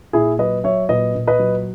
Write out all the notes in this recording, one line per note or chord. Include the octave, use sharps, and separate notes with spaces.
A#2 E4 G#4
F#3 B4 D#5
F#3 C#5 E5
A#2 B4 D#5
A#2
B4 D#5
F#3